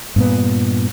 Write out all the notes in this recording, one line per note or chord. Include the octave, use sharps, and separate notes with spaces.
G2 A#2 B3